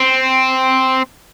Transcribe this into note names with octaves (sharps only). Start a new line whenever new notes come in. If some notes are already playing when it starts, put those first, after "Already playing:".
Already playing: C4